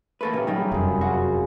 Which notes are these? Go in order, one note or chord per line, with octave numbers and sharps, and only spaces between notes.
E3 A3 A#3 A4 B4
A#2 C#3 G4 A#4
F#3 G3 D#4 E4 B5
F1 F#2 F4 G#4 B5
C#3 F#4